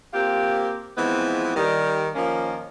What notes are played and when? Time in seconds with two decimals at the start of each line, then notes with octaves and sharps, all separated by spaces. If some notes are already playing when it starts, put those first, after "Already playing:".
0.13 A#3 C4 F4 G4
0.98 E3 F3 G#3 B3 C4
1.56 D#3 G3
2.15 D#3 F3 A#3 C#4